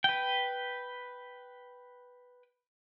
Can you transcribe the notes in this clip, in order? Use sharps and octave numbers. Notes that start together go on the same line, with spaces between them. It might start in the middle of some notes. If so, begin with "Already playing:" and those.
B4 G5